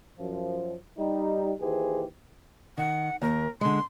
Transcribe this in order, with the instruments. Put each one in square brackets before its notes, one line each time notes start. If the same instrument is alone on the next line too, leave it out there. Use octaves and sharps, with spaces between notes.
[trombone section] F#2 F3
G3 D#4
D#2 E3 G4 G#4 C5
[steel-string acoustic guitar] D#3 [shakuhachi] F#5
[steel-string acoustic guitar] D#2 [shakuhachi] A#4
[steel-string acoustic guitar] D3 G#3 [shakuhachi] C6